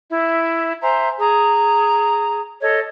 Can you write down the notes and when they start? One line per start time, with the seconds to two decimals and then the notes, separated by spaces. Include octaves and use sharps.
0.11 E4 E5
0.82 C5 E5 G#5 A#5
1.19 G#4 A#5
2.62 A4 C#5 D#5